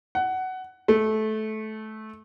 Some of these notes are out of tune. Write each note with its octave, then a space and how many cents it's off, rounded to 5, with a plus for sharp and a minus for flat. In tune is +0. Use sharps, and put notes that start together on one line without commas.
F#5 +15
A3 -20